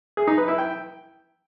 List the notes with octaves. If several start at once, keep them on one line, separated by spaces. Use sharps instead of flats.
G#4
D#4
B4
E4
G5